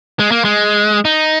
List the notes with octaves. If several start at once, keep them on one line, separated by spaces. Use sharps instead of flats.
G#3
A#3
G#3
D#4